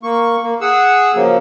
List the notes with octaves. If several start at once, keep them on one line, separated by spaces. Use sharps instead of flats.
A#3 C#6
A#3
G#4 F#5 E6
C#3 F3 F#3 A#3